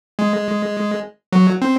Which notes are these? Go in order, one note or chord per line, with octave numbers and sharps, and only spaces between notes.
G#3
F#3
C4